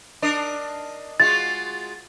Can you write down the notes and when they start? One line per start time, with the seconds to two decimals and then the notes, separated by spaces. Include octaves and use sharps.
0.22 D4 A#4 D#5
1.20 G#3 F4 F#4 A6